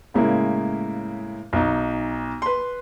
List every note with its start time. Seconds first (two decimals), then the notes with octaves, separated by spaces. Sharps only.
0.14 A2 C#3 G#3 A#3 E4
1.53 B1 D#4
2.42 B4 C6